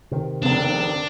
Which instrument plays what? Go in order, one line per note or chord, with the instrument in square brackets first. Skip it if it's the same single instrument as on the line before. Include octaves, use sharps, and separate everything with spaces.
[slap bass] C3 D#3
[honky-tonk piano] F1 C#3 B3 [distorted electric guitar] D4